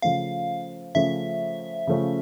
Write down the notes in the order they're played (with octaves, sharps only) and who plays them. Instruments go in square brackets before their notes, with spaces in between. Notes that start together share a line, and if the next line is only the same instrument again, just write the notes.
[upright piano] C#3 F3 A3 C#4 [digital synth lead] F5
[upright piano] C#3 F3 A3 C#4 [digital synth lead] E5
[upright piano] C#3 F3 A3 C#4